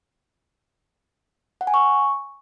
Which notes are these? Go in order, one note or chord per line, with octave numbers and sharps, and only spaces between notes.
F#5
G#5
C#6